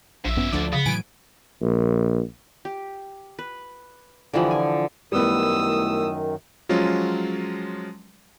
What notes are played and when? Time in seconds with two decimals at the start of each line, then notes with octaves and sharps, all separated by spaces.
0.25 A#1 A#2 E5
0.37 G2 B3 C#4
0.52 D2 D3 F3 D5
0.73 C#3 B3
0.85 A2 E3 F#3 G#5 D7
1.61 A#1
2.65 G4
3.39 B4
4.34 D3 E3 F3 G3
4.51 G#5
5.12 F#2 D#3 G3 A3 B3 E4 D#6 E6
6.69 F3 F#3 G#3 C#4 F4